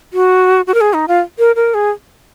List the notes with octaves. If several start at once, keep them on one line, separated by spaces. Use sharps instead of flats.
F#4
F#4
A#4
G#4
D#4
F4
A#4
A#4
G#4